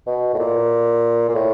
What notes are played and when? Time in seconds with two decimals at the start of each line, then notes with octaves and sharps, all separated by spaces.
0.07 B2
0.34 A2
0.39 A#2
1.29 A#2
1.35 A2